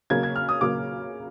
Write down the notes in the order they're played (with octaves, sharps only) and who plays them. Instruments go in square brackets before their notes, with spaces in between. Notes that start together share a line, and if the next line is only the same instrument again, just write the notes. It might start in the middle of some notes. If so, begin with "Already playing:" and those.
[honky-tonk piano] C#3 F#3 A#3 [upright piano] G#6
[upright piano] G#6
F6
D#6
[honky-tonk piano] C#3 F#3 A#3 [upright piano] D6